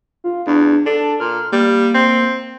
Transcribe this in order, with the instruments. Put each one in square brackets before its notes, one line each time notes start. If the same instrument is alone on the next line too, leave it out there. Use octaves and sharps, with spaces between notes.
[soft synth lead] F4
[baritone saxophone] E2 [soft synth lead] D4
[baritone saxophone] D4 [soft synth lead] A4
[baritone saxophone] A#2 [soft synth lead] F6
[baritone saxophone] G3 [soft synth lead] A#3
[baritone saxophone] C4